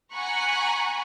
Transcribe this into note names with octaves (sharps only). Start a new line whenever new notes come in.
F#5 G#5 A#5 B5 C#6 F#6